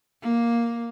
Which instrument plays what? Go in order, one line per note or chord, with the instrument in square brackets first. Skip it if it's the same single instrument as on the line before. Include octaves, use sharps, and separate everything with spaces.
[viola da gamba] A#3